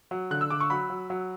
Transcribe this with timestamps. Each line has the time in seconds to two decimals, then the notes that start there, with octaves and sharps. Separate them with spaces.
0.11 F#3
0.31 D3 F#6
0.41 E6
0.50 D3 D6
0.60 C#6
0.70 F#3 B5
0.90 F#3
1.10 F#3